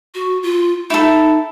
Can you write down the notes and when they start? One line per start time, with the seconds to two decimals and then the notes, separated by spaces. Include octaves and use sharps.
0.14 F#4
0.43 F4
0.90 D#4 E4 A4